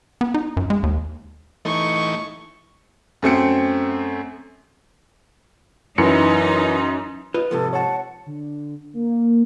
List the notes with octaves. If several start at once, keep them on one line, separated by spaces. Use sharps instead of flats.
B3
D#4
F#2
G#3
D#2
E3 A3 D#4 C#6
F#2 A3 C4 C#7
F#2 E3 D#4 E4 C#7
F4 B4 D#5
G#2 C3 F3 A4
C#5 F#5 A5
D3
A#3